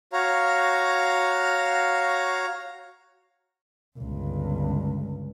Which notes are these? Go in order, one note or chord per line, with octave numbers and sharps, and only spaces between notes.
F#4 C#5 F5 A#5
G1 C#2